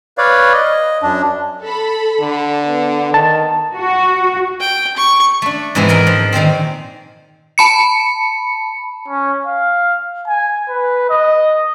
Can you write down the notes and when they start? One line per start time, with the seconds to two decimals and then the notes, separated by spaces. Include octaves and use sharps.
0.18 B4 C#5 D5 F5
0.54 D#5
1.03 F#2 D4
1.64 A4 B5
2.20 D3
2.66 B3
3.14 D#3 A5
3.76 F#4
4.60 G5
4.97 C#6
5.42 A3 D4
5.75 G#2 C3 E3 G#3 B3 C4
5.88 G#4 A#4 B4 D#5 F#5 G#5
6.07 F3
6.32 A#2 D#3 G#3 C4
7.58 A5 B5 C#7
9.08 C#4
9.46 F5
10.28 G#5
10.69 B4
11.10 D#5